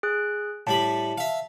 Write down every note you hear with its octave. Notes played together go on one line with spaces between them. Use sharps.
G#4 F#6
A2 G3 A5 B5
E5 F5